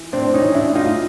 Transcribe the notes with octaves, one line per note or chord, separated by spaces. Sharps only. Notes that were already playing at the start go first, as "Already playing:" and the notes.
Already playing: E3
A2 C4 D4
C#4 D#4
E3
D4 E4
A2
D#4 F4